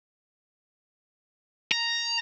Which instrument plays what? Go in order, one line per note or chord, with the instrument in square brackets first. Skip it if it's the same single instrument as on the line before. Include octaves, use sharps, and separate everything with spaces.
[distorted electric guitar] A#5